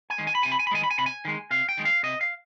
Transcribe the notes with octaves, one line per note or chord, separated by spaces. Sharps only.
G#5
D#3 G#3
G#5
B5
C3 G#5
B5
G#5
B5
D#3 G#3 G#5
B5
G#5
C3 B5
G#5
D#3 G#3
C3 F5
G5
D#3 G#3
F5
C3 D#5
F5